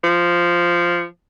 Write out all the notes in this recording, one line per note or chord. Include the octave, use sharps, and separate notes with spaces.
F3